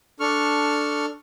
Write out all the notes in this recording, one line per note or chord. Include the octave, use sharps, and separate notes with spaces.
D4 A4 C#6 F6